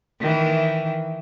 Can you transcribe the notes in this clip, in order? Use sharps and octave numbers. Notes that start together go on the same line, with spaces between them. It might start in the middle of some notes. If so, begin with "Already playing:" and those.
D#3 E3